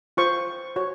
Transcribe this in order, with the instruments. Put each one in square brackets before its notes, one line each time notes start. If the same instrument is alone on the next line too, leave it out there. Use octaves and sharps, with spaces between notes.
[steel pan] F4 C5 C#6
F#4 C#5